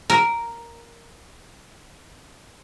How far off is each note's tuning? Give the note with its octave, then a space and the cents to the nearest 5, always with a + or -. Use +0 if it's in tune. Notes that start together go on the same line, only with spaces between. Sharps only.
A#4 +0